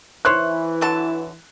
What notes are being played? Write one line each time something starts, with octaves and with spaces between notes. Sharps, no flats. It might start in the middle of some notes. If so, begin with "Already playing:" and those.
E3 E4 C5 C#5 F#6
D3 F#3 A5